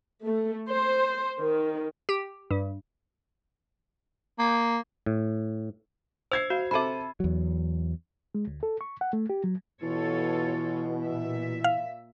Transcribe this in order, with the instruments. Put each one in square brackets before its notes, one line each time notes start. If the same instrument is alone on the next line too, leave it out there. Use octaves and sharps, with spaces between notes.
[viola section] A3
C5
D#3
[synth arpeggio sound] G4
G2
[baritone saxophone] A#3
[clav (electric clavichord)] A2
[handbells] C5 [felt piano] E6 G#6 C7
[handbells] F#4 [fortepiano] F5
[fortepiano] C3 A4 D6 [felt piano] C5 D#7 [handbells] E5 B5
[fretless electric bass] E2 F#3
[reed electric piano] G#3
D2
A4
C#6
F#5
A3
G4
F#3
[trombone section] B2 [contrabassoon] E3 [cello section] F4 A4 C#5
[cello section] A#2 E5
[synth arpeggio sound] F5